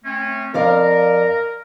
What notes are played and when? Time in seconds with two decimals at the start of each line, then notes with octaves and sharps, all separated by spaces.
0.04 A3 C4 C#4
0.54 F2 A#4 D5 F5